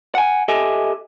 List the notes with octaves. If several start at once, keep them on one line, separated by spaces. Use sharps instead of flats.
F#5 G#5
G4 A4 D#5 E5 G#5